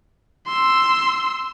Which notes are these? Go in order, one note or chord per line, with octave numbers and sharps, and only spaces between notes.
C6 E6